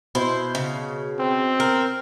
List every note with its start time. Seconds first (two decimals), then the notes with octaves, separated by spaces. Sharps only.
0.15 B2 E4 C5
0.55 C#3
1.20 C4
1.60 A#4